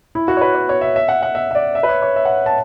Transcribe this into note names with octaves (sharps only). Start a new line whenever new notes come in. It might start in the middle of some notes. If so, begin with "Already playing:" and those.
E4
F#4
C#5
B4
C#5
C#5
E5
E5
F#5
F#5
E5
E5
D5
E5
B4
C#5
C#5
E5
F#5
A5